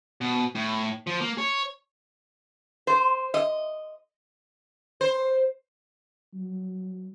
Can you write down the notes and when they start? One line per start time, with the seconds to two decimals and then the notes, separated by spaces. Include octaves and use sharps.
0.21 B2
0.55 A2
1.07 F3
1.20 A#3
1.38 C#5
2.87 C5
3.34 D#5
5.01 C5
6.34 F#3